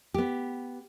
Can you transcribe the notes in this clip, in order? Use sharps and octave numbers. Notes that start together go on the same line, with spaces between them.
B3 G4